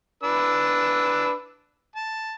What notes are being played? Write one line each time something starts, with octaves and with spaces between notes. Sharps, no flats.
D4 B4 E6
A5